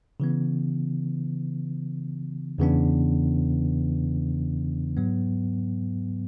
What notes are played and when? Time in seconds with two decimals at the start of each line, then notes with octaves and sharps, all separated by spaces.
0.20 C#3 E3 B3
2.58 E2 C#3 E3 B3 D4
4.97 G#2 F#3 B3